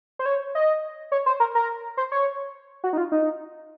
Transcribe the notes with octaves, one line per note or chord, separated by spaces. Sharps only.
C5
C#5
D#5
C#5
C5
A#4
A#4
C5
C#5
F#4
D#4
F4
D#4